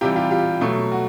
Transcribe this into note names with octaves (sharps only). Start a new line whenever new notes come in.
C3 E3 G3 F4 G4
F4 G4
F4 G4
B2 F#3 A3
F#4